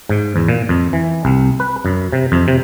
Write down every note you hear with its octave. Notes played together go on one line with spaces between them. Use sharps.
G#2
E2
A#2
F2
E3
C2
B4
F#2
C3
F2
C3